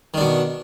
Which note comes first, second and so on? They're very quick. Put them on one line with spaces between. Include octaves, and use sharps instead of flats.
D#3 D4 B2